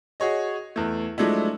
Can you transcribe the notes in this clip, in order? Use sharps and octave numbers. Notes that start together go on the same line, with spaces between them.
F#4 G#4 C#5 D#5
E2 A3
F3 F#3 G#3 A3 D4 E4